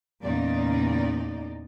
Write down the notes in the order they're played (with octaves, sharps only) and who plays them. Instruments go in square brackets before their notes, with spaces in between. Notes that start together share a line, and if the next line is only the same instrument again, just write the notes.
[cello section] E2 A#2 C#3 D#4 D5